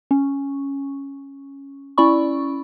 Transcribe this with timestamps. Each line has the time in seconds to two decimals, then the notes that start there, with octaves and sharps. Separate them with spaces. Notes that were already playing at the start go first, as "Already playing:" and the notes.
0.11 C#4
1.98 C#4 E4 D5 B5 C#6